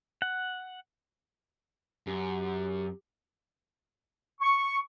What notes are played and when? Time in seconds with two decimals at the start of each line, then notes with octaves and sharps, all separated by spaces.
0.22 F#5
2.07 F#2 G4
4.41 C#6